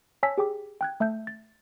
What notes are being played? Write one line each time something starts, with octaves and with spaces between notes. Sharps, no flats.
C#5 G#5 A5 E6 B6
G4 G#4 G5 D6
G5 F#6 G#6
A3 E5 A5 G6
A6